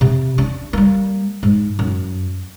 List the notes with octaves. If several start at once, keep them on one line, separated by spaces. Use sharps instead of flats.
C3
D4
G3 A#3
G#2
F#2